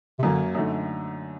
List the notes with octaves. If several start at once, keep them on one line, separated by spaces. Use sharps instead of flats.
C3
F#2 D3 F#3 A#3
F#2 D3 A3 D#4